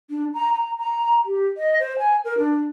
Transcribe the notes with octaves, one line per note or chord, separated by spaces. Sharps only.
D4
A#5
A#5
A#5
G4
D#5
C5
G#5
A#4
D4